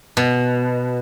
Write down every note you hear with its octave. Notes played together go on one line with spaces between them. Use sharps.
B2